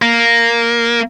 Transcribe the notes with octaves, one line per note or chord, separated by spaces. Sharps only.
A#3